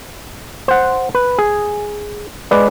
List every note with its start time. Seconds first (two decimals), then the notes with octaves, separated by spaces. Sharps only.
0.68 C5 F#5
1.15 B4
1.39 G#4
2.51 G#3 B4 D5